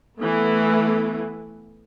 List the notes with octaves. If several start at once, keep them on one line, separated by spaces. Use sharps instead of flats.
E3 A3 B3